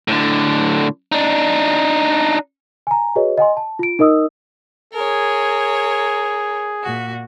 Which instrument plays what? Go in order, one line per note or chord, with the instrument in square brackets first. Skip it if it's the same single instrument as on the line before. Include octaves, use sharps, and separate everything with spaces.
[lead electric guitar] A2 D3
D4 D#4
[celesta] G#5 A#5
F#4 G#4 B4 C#5 D#5
D#5 F#5 G#5 C6
A5
F4 D7
D#4 A#4 D#5 D#6 E6
[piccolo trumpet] G#4 [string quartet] A#4 C#5
[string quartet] A#2 F#4